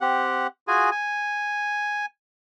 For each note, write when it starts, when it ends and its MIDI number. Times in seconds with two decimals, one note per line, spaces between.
0.01 0.47 60
0.01 0.47 67
0.01 0.47 78
0.68 0.90 65
0.68 0.90 66
0.68 0.90 68
0.68 0.90 80
0.91 2.06 80